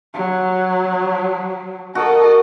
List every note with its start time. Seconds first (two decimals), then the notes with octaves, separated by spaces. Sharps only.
0.14 F#3
1.95 F#4 A4 A#4 D#5